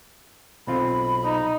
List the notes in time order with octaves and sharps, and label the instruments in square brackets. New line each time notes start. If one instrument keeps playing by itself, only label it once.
[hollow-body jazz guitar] B1 C4 F4 [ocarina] B5
[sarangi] D#4